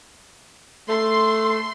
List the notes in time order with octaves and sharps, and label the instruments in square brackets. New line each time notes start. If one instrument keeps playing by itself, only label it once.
[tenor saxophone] A3 [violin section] C6